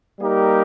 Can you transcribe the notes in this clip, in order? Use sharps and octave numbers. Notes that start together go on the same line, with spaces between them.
G3 A#3 D#4 G4 A#4